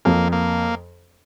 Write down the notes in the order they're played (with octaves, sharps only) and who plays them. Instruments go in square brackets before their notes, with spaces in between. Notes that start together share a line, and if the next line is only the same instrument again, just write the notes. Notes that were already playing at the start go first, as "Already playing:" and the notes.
[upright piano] F2 [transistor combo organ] A#3
[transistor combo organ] A#3